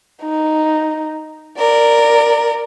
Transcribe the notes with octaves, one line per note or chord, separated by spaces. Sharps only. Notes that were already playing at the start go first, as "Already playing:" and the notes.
D#4
A#4 D5